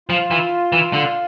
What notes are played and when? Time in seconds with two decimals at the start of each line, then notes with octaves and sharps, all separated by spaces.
0.09 F3 F4
0.31 E3
0.72 E3
0.93 D3